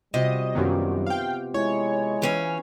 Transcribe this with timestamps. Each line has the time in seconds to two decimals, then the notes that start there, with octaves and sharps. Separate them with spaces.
0.14 C3 G3 F4 F#4 D#5
0.55 F#2 D#3 F#3 B3 F4 G4
1.06 F5 G5
1.54 G#3 E4 C#5
2.22 E3 C#4 F5